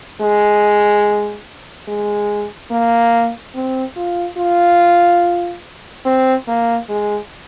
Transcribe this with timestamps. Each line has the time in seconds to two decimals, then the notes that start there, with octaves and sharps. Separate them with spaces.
0.21 G#3
1.88 G#3
2.71 A#3
3.55 C4
3.96 F4
4.38 F4
6.05 C4
6.48 A#3
6.89 G#3